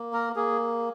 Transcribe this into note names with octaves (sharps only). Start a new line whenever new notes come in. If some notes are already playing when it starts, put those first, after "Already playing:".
Already playing: A#3
A#4
A#3 G#4